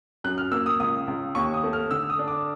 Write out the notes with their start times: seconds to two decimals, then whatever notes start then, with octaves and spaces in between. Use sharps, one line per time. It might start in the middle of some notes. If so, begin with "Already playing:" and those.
0.24 F#2 F#6
0.38 F6
0.52 A#3 E6
0.66 D#6
0.80 C#2 D#6
1.08 C#2
1.35 D#2 C#6
1.54 D#6
1.64 A3
1.73 F6
1.91 D3 E6
2.10 D#6
2.19 D4
2.28 D6